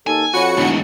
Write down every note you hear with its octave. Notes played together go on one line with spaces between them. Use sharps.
D#2 A4 G#5
F2 F#4 C#5 B5 C#6 C#7
E1 D2 G#2